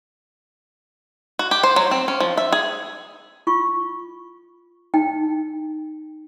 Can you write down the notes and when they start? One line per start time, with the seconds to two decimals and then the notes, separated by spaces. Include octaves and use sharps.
1.39 F#4
1.51 G4
1.63 C5
1.76 F#3
1.91 C4
2.08 C#4
2.20 F3
2.37 E5
2.52 G#4
3.47 F4 C#6
4.94 D#4 G5